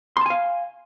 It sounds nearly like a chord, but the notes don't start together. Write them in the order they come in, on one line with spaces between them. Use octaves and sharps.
C6 A5 G#5 F5